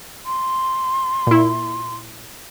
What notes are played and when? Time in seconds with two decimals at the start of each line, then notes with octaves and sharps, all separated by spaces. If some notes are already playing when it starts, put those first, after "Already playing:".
0.26 C6
1.27 A#2 E4